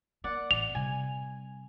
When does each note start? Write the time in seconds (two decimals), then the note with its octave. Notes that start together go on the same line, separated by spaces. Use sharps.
0.24 A#3 D5 F#5
0.51 A1 F7
0.75 C3 G3 G#5